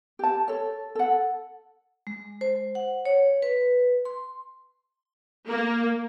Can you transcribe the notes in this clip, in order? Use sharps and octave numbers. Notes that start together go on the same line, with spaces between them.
G4 A5
A4 C#5
A4 F#5
G#3
C5
F#5
C#5
B4
C6
A#3